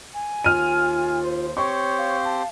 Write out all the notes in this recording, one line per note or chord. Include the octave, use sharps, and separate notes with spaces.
G#5
D#2 F4 F6 D#7
C5
C4 G4 C5 C#5 C#6
F5
A5